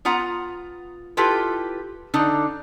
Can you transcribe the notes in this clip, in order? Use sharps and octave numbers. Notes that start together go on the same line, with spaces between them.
B3 F4 F#5 A#5
E4 F4 G4 A4 B4
D3 D4 D#4